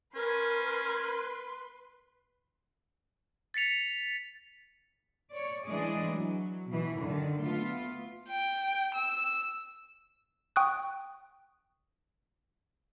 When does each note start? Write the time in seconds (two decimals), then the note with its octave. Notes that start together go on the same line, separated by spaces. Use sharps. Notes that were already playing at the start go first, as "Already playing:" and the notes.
0.15 C#4 A#4 B4 C6
3.54 A6 B6 C#7 F7
5.31 C#5 D5
5.66 E3 G#3 D4 G#4 D5 D#5
6.12 F#3
6.69 B2 E3
6.99 F#2 D3 D#3
7.42 A3 B3 F4
8.29 G5
8.94 E6
10.56 G5 C#6 D#6 F#6